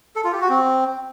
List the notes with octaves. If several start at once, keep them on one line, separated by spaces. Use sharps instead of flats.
A4
F4
G4
F#4
C4